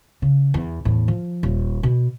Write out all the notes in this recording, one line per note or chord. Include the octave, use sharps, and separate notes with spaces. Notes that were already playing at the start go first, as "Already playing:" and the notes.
C#3
E2
E2 A2
F3
D#1
B2